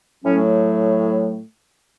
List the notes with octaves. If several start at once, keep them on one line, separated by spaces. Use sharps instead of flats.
A2 F#3 A3 C#4